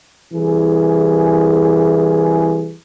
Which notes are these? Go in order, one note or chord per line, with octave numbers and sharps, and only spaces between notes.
C2 E3 G#4